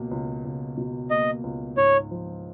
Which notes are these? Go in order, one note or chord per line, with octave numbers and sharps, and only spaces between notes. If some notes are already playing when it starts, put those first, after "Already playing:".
Already playing: C#2 B2 A#3
C#2
C#2
B2
A#3 D#5
C#2
G#2 C#5
F3